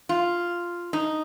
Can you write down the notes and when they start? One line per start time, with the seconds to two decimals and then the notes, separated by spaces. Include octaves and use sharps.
0.09 F4
0.93 D#4